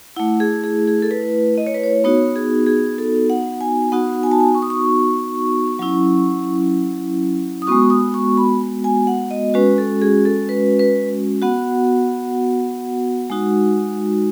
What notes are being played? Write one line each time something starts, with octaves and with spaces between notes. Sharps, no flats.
A3 E4 F#5
G#4
G#4
G#4
A4
B4
D#5
C#5
B4
C#5
B3 D#4 F#4 C#5
G#4
G#4
A4
F#5
G#5
B3 D#4 F#4 F#5
G#5
A5
G#5
C#6
D#6
C#6
F#3 C#4 E4
D#6
G#3 B3 F#4 C#6
D#6
C#6
B5
G#5
F#5
D#5
G#3 C#4 F#4 B4
A4
G#4
A4
B4
B4
B3 F#4 F#5
G#3 D#4 F#4